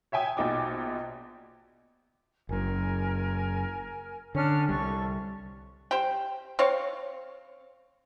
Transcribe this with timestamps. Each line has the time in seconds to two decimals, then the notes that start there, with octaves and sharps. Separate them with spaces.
0.12 C#5 E5 G5 G#5 D#6
0.37 A#1 B2 D#4 G5 D6
2.49 F#1 F#2 A#4 G#5
4.35 D3 C#4 D4 F6
4.69 C2 G3 A4 C#6
5.91 G4 C5 G5
6.59 C4 C#5 F5